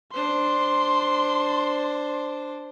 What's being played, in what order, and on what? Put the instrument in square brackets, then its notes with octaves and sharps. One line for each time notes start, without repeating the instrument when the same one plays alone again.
[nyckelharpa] D4 C5 [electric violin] C6